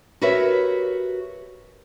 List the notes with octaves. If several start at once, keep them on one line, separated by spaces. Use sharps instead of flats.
F#4 G4 A#4 B4 C#5 E5